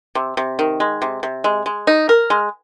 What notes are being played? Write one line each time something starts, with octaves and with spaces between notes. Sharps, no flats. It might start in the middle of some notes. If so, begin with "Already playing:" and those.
C3
C3
D#3
G#3
C3
C3
G#3
G#3
D#4
A#4
G#3